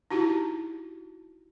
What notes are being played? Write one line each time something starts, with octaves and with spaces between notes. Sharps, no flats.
D#4 E4 F#4 G4